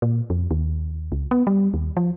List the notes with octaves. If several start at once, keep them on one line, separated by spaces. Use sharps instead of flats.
A#2
F2
D#2
C#2
B3
G3
D#2
F3